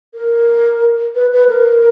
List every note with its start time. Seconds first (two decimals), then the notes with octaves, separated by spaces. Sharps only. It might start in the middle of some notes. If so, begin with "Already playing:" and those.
0.14 A#4
1.15 B4
1.32 B4
1.49 A#4